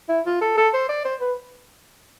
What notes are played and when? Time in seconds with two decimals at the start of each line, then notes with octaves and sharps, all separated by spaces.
0.09 E4
0.26 F4
0.41 A4
0.57 A4
0.73 C5
0.89 D5
1.05 C5
1.21 B4